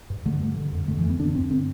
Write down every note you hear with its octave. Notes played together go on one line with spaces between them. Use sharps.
G2
D3 A3
G2
D3
F2
D3 A3
E3
F2
B3
D3 D4
G2 C4
D3 C4